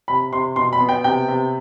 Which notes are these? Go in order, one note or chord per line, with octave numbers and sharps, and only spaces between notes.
C3 B5
C3 C6
B2 C6
B5
B3
G5
C3 G5
C3